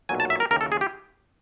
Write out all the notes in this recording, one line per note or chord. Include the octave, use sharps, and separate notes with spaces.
B1 A#2 F#3 G#5
A5
E5
A#4
D#2 C#3 E3 A#4
A4
G#4
G4